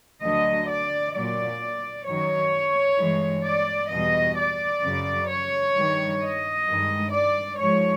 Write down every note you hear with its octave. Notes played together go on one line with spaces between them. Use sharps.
D2 D3 F#3 D#5
D5
A#2 F#3 D5
F#2 D#3 F#3 C#5
G2 E3 G#3
D5
E2 B2 G3 D#5
D5
F#2 C#3 F#3
C#5
G2 D#3 G3
D#5
G2 D#3 G#3
D5
G#2 F3 G#3 C#5